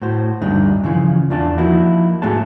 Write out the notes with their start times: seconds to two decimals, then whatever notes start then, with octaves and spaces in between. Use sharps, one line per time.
0.02 A2 F#4 C5
0.42 D2 G2 G3 D4 D#4
0.84 C#3 E3 F3
1.30 E2 D4 F4 D5 A5
1.58 F3 A#3 D#4 E4 F#4
2.22 G#2 A3 A#3 F#4 G#4 A5